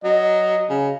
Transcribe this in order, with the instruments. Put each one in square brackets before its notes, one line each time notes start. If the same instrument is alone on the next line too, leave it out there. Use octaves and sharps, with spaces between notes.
[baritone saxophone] F#3 [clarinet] D#5
[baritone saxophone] C#3